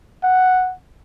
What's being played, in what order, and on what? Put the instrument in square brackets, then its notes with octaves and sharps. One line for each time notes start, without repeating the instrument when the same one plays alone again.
[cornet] F#5